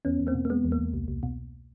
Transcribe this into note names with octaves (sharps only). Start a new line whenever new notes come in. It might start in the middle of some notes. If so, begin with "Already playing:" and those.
E2 B3 C#4
E2
A#3 C4
B2
A#3
G#3 B3
E2
A#3
E2
C2
C2
B2